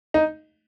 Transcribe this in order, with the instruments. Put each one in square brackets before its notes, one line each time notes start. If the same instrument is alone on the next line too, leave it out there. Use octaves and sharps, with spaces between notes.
[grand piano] D#4